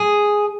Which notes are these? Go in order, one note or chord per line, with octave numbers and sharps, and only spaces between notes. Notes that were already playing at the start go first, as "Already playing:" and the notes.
Already playing: G#4